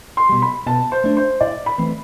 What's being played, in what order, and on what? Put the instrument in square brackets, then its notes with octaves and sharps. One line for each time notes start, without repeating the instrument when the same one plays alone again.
[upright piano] C6
[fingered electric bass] B2 G3
[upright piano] B5
[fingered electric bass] B2 [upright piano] A5
[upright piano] C5
[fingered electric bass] A3 D4
[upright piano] C5
[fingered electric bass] A2 [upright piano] D5
[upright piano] B5
[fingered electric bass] E3 A3 C4